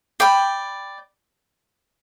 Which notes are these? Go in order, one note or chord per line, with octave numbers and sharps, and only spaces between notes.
D5 G5 B5